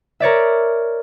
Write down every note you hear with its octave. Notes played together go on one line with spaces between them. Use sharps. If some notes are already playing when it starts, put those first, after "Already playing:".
A#4 C#5 D5 E5